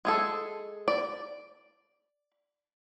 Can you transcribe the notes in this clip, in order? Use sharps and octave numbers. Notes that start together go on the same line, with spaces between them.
G#3 G#4 A4
D5